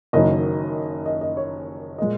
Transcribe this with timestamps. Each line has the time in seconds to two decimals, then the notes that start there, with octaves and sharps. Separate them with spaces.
0.13 F#1 F#2 D#3 F#3 D#5
1.06 D#5
1.21 D#5
1.37 C#5
1.98 A#2 G#3 D#5